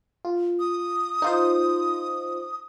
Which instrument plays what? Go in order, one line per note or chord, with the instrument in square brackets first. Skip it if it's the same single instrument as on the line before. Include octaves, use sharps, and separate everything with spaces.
[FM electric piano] F4
[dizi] D#6
[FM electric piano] D#4 F4 C5